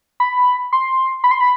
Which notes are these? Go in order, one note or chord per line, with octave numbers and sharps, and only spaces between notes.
B5
C6
B5
C6
B5